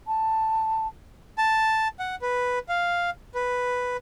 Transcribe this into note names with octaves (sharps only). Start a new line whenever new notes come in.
A5
A5
F#5
B4
F5
B4